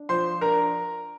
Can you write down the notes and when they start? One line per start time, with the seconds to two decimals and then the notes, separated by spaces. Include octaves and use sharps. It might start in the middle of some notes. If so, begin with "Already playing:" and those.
Already playing: D4
0.09 F3 C5 C6
0.41 D4 A#4 A#5